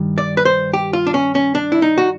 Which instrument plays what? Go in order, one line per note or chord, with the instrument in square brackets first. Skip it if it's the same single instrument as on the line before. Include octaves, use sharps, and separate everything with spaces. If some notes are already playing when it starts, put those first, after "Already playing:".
Already playing: [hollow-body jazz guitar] G2 D#3
D5
B4
C5
G4
F4
D4
C#4
C#4
D4
E4
D#4
F#4